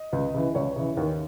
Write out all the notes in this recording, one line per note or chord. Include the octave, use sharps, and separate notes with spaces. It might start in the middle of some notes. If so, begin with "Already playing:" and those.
Already playing: D#5
C#2
C#3 E3
C#2 C#5
C#3 E3
D#2